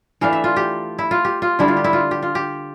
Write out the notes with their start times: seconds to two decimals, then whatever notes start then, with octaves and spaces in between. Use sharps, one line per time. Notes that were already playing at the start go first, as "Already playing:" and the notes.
0.21 E3 A3 D4 F5
0.33 E5
0.44 F4
0.56 G4
0.99 E4
1.11 F4
1.25 G4
1.42 F4
1.59 D3 G3 D4 E4
1.68 F4
1.77 G4
1.84 E4
1.93 F4
2.11 G4
2.23 F4
2.35 G4